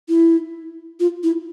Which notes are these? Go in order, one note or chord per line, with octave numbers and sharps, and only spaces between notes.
E4
F4
E4